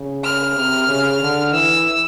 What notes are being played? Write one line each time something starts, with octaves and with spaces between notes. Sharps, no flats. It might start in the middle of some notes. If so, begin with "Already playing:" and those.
Already playing: C#3
F6
C3
C#3
D3
E3 E6